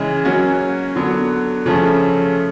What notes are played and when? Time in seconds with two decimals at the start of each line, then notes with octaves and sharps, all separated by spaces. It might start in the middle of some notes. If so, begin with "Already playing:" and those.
Already playing: C#3 E3 G#3
0.25 F#3 A#3 C#4 F#4
0.96 D3 F#3 B3
1.66 C#3 F3 A3 C#4